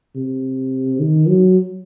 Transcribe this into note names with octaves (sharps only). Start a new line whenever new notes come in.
C3
D#3
F#3